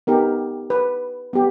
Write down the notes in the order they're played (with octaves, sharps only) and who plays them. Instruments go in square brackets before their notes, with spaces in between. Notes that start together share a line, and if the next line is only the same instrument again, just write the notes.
[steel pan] B3 D#4 G4 A#4
B4
B3 G4